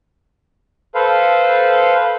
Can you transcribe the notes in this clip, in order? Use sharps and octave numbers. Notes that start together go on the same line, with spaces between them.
A4 B4 C5 F5